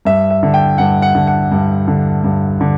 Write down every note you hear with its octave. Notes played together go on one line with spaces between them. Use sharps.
G2 E5
E5
D3
G5
G2 F#5
F#5
D3
F#5
G2
D3
G2
D3